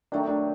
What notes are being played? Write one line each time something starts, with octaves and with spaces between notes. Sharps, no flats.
D#3 F#3 A3 D4 D#4
D4